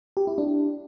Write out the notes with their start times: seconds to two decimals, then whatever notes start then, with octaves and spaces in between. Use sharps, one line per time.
0.17 G4
0.27 E4
0.38 D4